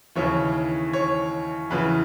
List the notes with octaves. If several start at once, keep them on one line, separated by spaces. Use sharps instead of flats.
D#2 C#3 E3 C#5
C#5
E2 C#3 E3 B4